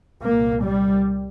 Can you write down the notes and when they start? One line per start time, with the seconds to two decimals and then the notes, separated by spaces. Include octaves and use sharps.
0.25 C2 A#2 A#3
0.65 G3